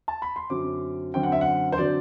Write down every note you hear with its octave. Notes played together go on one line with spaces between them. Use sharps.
A5
B5
C6
F#2 D3 F#3 C4 D6
F#2 D3 F#3 C4 G5
F#5
E5
F#5
C5
D3 F#3 C4 D5